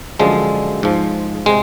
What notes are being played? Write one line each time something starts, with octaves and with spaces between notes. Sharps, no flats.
F#2 D3 F3 G#3
G#2 F3
C3 G#3